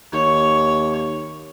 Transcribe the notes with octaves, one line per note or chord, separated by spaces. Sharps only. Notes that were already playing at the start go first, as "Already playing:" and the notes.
D#2 C#5